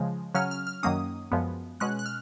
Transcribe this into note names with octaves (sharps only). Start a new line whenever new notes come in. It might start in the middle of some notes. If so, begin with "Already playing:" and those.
Already playing: C#3 F3 G#3
C#3 F#3 C#4 F6
F6
F6
F#2 D#3 F#3 A#3 C#4 D#6
F#2 F3 G#3 B3
B2 G#3 C#4 F#6
F#6
F6